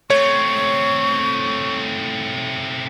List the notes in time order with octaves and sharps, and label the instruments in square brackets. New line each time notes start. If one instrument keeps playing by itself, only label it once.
[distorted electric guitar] A3 C4 [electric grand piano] C#5 [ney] C#6